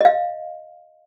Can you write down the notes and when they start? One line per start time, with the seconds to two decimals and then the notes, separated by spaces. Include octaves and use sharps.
0.01 D#5 F5